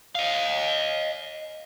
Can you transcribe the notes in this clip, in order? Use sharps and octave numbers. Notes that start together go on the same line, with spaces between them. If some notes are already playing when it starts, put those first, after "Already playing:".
D#5 F5